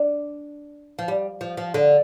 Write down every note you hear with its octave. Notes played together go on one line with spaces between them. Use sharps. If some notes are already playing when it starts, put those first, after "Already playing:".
Already playing: D4
F3
G3
F3
F3
D3